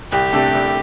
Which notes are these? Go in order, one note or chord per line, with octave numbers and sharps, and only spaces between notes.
C2 G4
C3 A3 D4 A4
C2